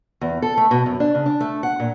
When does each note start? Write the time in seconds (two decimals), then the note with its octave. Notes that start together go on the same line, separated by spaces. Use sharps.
0.21 E2
0.42 A4
0.57 A3
0.71 B2
0.86 F#2
1.00 D4
1.15 C#3
1.26 D4
1.41 A3
1.63 F#5
1.80 A#2